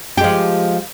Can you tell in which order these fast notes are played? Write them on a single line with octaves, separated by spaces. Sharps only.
G4 G#3 F3